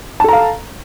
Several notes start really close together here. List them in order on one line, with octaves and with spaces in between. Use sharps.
A5 A4 A#5 F5